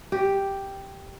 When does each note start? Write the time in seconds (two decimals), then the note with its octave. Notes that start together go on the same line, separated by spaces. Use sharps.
0.12 G4